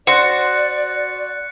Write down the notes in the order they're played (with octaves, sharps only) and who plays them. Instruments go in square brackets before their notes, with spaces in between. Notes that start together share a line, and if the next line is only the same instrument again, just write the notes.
[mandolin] F#4 [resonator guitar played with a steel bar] C5 [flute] D5 [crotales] F#6 C#7